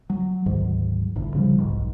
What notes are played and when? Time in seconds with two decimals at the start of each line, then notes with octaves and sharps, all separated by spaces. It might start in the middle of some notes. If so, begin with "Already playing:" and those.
0.10 F#3
0.46 D2 G#2 D#3 F#3
1.16 G1 E2 A2 D3
1.35 C#3 F3 G3
1.57 D1 B1 G#2